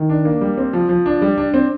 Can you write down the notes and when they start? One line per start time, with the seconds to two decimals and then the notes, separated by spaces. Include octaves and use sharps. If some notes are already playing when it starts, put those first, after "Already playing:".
Already playing: D#3
0.09 D4
0.25 A#3
0.41 G3
0.58 C4
0.73 F3
0.89 F3
1.06 D4
1.22 G3
1.38 D4
1.54 C4